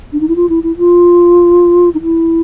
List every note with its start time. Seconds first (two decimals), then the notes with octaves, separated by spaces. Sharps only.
0.13 D4
0.20 D#4
0.28 E4
0.36 F4
0.49 E4
0.63 E4
0.77 F4
1.94 D#4
2.02 E4